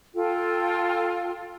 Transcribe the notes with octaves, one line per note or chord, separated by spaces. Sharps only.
F4 A4 G5